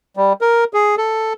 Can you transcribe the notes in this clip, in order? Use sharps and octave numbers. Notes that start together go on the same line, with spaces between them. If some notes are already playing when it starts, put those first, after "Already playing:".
G3
A#4
G#4
A4